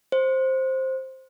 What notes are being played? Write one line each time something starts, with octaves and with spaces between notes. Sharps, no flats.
C5